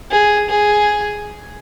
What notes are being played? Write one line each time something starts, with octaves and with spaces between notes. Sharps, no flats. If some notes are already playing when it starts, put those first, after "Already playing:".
G#4
G#4